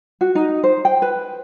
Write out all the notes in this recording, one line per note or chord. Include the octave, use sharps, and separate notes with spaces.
F#4
D#4
C5
G5
B4